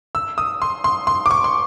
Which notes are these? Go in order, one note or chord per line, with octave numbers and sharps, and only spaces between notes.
E6
D#6
C6
C6
C6
D6
C#6
C6